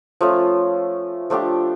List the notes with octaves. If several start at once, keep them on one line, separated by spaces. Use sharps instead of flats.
F3 A3 C#4
F3 A3 D4 G4